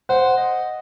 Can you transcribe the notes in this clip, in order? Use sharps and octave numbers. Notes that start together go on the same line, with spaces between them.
C5 F#5
D#5